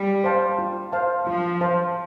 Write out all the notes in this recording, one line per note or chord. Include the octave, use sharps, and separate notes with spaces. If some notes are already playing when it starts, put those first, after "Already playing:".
Already playing: G3
C5 F5 A5
F4
C5 F5 A5
F3 F4
C5 F5 A5